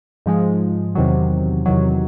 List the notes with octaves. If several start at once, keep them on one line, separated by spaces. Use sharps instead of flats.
G#2 F3 G#3
E2 C3 D#3 F#3
E2 C3 D#3 F#3